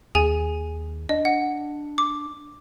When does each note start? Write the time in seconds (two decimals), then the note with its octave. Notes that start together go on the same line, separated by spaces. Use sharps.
0.15 D#2 G#4 G#5
1.09 D4 D#5
1.25 F#5
1.98 D6